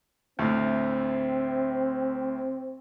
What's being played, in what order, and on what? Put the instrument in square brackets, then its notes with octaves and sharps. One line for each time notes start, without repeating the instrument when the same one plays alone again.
[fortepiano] D2 A2 [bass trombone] C4